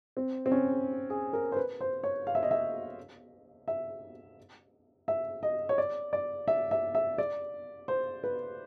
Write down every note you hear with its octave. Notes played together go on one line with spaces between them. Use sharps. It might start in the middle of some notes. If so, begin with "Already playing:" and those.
C4
C4
C#4
G#4
A#4
C5
B4
C5
C#5
F5
E5
D#5
E5
E5
E5
D#5
C#5
D5
D5
E5
E5
E5
D5
C5
B4